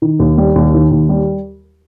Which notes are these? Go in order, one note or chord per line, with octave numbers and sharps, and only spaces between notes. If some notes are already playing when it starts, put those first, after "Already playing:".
D#3
D#2
G3
D#2
D#3
D#2
G3